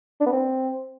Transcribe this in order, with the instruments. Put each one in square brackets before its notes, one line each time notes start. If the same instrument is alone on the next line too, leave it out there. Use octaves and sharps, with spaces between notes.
[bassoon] D4
B3
C4